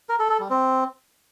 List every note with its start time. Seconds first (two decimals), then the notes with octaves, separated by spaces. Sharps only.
0.09 A#4
0.19 A4
0.30 A4
0.40 G3
0.50 C4